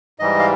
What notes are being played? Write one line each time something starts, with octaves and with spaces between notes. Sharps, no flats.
G#2 E3 G3 D#5
F5